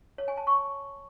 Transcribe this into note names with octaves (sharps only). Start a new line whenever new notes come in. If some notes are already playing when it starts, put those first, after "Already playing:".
C#5
G#5
A5
C#6